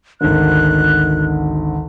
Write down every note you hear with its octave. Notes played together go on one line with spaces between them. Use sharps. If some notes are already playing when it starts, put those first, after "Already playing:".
G#1 D2 F#6